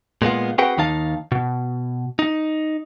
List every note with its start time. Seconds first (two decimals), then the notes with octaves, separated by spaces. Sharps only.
0.22 A#2 G#3 B3 F4
0.58 C4 F#4 G#4 B4 F#5 G5
0.78 D#2 D#3 D#4 F5 A5
1.32 B2
2.19 D#4